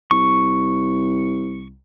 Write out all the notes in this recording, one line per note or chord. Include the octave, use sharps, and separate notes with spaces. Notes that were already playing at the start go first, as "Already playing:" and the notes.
C2 C#6